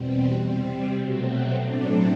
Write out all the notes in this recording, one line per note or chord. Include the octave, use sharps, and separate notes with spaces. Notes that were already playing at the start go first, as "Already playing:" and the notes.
Already playing: E2 B2 G3 C4
C3 G3 C4
B2 F#3 A3 C4 F#4
A2 F#3 A3 C4 D4